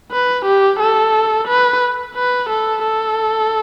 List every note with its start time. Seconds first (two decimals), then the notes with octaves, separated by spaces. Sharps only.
0.11 B4
0.45 G4
0.80 A4
1.47 B4
2.15 B4
2.49 A4
2.84 A4